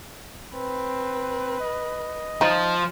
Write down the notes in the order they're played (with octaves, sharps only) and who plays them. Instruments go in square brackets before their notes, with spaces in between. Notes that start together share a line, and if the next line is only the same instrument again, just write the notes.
[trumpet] C4 [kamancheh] B4
[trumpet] D#5
[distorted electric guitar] F3 [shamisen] D#4 F4